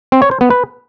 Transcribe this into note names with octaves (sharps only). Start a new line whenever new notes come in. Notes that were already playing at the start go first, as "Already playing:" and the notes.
C4
C#5
C5
B3
B4